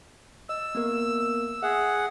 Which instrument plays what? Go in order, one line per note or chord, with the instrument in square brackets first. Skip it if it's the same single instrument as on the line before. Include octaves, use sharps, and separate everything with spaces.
[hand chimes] D#5 [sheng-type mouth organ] E6
[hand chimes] A#3 B3 A#4
[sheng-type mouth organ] G#4 F#5 [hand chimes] E5